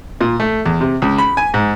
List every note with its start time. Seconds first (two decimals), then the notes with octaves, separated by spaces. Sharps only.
0.21 A#2
0.40 A3
0.66 E2
0.81 C3
1.02 C#2
1.18 B5
1.37 G#5
1.54 G#2